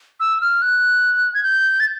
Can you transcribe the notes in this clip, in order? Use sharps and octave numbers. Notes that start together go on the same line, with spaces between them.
E6
F6
F#6
G#6
G6
A6